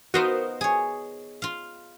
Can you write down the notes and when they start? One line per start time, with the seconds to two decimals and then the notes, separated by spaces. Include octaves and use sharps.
0.14 B3 D#4 F4 F#4 A#4 C5
0.61 G#4 C#5
1.42 F4 F5